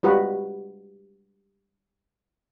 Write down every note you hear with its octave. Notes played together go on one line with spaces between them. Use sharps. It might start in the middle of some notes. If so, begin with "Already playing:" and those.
G3 G#3 F4 F#4 B4